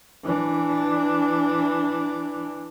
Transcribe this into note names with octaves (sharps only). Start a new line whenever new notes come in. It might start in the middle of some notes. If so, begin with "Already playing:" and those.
E3 D4